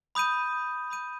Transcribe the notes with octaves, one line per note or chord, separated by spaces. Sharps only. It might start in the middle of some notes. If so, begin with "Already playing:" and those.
B5 D#6 G6 D#7
B5 D#6 G6 D#7